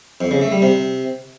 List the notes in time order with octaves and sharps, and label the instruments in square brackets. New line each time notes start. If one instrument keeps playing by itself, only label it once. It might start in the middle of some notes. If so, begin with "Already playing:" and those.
[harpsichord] F2
C#3
A3
G3
C3